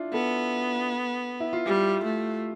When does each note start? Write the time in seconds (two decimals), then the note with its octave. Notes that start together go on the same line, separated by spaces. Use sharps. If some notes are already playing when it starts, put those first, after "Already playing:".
Already playing: D4 E4 F4
0.13 B3 A4
1.40 E4
1.53 F4
1.66 G3 G4
2.05 A3